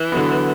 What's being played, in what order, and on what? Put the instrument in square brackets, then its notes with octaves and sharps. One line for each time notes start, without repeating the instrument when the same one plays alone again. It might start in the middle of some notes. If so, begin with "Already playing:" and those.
Already playing: [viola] E3
[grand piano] D3 F#3 B3